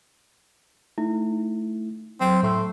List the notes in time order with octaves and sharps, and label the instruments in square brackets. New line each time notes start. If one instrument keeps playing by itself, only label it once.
[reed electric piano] A3 E4 [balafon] D#4
[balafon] F#3 [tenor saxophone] C4
[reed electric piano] A2 C6 E6 [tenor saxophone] A3